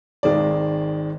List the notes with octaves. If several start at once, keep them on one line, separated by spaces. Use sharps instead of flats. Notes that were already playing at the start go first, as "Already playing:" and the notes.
G#1 D#3 G#3 D5